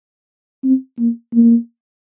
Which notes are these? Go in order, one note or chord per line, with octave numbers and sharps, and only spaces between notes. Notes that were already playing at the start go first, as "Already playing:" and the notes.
C4
A#3
A#3